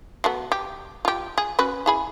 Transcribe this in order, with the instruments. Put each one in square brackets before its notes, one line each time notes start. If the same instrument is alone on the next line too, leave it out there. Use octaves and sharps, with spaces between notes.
[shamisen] F#3 A3 B3
G4
F4 G4
G#4
C#4 F#4 B4
E4 G#4 B5